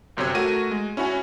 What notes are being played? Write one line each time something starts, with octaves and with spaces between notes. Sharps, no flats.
G1 F#2 C3 C#5 G#6
A3 F#4 A#4 D#7
G#3
C#4 E4 F#4 C#5 G#5